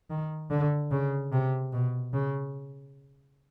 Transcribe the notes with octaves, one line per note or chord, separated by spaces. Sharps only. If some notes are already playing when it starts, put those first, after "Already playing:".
D#3
D3
C#3
C3
B2
C#3